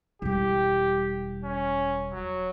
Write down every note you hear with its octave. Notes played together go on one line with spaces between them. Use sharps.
E1 G3 G4
C#4
F#3